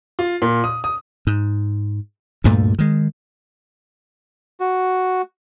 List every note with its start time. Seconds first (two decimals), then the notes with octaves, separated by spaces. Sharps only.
0.19 F4
0.42 A#2
0.64 D#6
0.84 D#6
1.27 G#2
2.44 D2 G2 A#2 A3
2.79 D#3 G#3
4.60 F#4